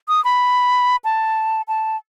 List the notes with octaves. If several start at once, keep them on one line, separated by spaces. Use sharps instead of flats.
D#6
B5
A5
A5